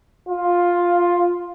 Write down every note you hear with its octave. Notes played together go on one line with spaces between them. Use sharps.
F4